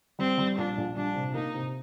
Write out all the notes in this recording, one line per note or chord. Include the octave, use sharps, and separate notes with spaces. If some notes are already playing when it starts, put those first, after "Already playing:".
G3 C4
G3
A#1 D4
A#1
G3 D4
C3
A#3 D#4
C3